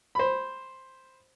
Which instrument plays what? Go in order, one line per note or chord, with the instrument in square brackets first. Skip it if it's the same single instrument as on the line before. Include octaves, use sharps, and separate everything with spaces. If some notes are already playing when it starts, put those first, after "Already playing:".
[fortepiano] C5 B5